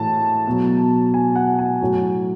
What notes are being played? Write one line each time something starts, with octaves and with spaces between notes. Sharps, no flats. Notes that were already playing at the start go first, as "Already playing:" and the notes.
Already playing: A2 E3 A5
B2 F#3
G#5
F#5
G#5
A2 F#3